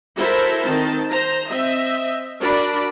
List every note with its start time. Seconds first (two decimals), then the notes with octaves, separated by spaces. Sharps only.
0.16 E4 F#4 A4 A#4 C5 E5
0.64 D#3 C4 A5
1.10 C5 A#5
1.49 C4 D#5 E5
2.41 D4 F#4 A#4 D5 B5